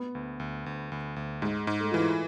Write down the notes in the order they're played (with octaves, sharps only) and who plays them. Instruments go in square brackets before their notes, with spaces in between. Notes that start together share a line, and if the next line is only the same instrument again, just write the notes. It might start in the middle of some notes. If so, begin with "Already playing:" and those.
Already playing: [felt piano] B3
[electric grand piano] D2
D2
D2
D2
D2
[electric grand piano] G#2 [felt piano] G#3
[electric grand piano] G#2
[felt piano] A3
[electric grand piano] E3 [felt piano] F4
[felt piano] E4